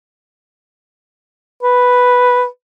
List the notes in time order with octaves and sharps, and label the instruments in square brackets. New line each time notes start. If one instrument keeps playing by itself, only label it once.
[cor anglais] B4